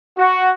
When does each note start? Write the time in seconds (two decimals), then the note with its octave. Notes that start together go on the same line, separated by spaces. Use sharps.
0.16 F#4